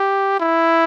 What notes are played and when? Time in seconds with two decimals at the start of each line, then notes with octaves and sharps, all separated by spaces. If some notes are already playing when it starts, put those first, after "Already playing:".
Already playing: G4
0.40 E4